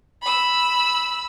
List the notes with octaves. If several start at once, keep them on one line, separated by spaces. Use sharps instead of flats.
B5 E6